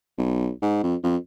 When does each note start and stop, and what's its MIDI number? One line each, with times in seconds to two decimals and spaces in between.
0.18 0.51 35
0.62 0.78 44
0.83 0.95 41
1.03 1.17 41